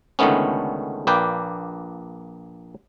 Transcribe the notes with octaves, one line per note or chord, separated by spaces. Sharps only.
C#2 D3 D#3 A3 B3 C#4
A#1 A#3 B4 D5 G5